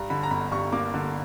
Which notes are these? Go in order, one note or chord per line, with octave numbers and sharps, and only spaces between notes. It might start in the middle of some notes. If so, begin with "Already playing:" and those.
Already playing: G2 A#5
D3 B5
A#5
G1 B5
G2 C#6
A#3 D6
D3